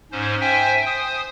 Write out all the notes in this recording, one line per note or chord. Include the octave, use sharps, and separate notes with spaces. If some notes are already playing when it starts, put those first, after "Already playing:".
G#2 C#4 C5
C5 E5 G5 G#5
C5 D#6